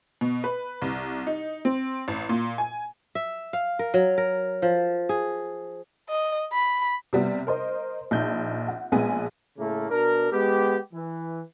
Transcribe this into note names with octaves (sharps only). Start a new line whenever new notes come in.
B2
B4
C2
D#4
C4
A1
A#2
G#5
E5
F5
A#4
F#3
A#4
F3
G#4
D#5
B5
C3 G3 B3
A#4 C5 D#5
A#1 D#4 G6
F#5
A#1 G#3 B3 G#5
A2 C#3 A3 A#3
B2 D4 A#4
G#3 B3 G4
E3